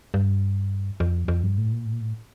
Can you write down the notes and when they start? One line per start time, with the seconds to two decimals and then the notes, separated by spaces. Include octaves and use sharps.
0.14 G2
1.00 F2
1.28 F2
1.43 G2
1.58 A2
1.72 A#2
1.85 A2
1.92 A#2
2.00 A2